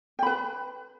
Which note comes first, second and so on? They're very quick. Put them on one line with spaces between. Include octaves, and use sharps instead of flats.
G5 B5 B4